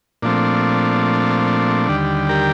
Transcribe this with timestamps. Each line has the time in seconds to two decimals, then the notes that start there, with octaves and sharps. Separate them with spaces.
0.23 A#2 F3 A3 C4 D4
1.88 D#2 D3 G3
2.29 G4 A#4